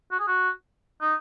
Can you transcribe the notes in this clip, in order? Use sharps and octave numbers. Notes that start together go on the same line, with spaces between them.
F#4
G#4
F#4
D#4